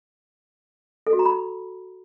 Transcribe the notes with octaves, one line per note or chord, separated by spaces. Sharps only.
A4
F#4
A#5
B5